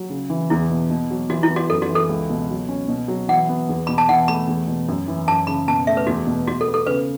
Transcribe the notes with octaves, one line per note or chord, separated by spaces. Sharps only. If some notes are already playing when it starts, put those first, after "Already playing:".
Already playing: F#3
C#3
E3
E2 E4
B2
B2
F#3
E3 F#4
E4
B3
F#4
F#2 A4
F#4
E3
A4
C#2
B2
F#3
C#4
B2
F#3
E3 F#5
B3
E2
B2 B5
A5
E3 F#5
A3 B5
E2
B2
F#2
E3
F#2 A5
C#3 B5
B2 A5
A3 E5
B4
E2 F#4
B2
B2 F#4
A4
B3
A4
C#3 B4